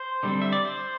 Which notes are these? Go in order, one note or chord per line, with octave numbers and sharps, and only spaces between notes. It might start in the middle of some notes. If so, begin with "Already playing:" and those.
Already playing: C5
D3 G3 C4
E5
D5
C5